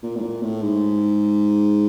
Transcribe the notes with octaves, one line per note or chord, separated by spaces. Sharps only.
A#2
A2
A#2
A2
G#2